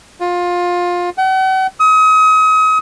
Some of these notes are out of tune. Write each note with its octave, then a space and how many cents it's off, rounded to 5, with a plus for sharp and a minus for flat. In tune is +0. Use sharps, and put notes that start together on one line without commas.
F4 +20
F#5 +40
D#6 +35